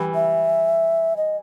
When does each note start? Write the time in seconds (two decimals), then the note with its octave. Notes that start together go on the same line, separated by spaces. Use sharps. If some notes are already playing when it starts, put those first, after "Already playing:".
Already playing: E3 G3
0.15 E5
1.17 D#5